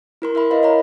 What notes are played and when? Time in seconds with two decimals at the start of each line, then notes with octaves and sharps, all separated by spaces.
0.22 E4 A#4 C6
0.35 A#4 E5 B5
0.51 E4 A#4 B4 D#5 F5
0.63 C#5 A#5